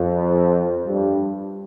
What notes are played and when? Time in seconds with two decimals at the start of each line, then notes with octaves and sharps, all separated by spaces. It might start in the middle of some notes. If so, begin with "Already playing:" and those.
Already playing: F2
0.87 G2